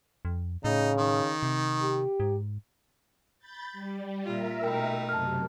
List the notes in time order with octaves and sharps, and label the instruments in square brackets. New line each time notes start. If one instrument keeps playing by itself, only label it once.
[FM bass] F2
[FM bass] A2 [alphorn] C#3 [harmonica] D#4
[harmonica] D#3
[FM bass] C3
[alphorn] G4
[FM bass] G#2
[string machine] B5 G6 A6
G3
[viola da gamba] A#2 F4 [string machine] A#4 E5
[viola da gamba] B2 A3 D#4 [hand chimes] G5 B5
[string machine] F#2 C3 [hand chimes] A5 F6